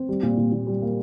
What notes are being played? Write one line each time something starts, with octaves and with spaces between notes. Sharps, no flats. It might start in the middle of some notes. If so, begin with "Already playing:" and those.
Already playing: C4
G3
A#2
A#2
A#2
G3
A#3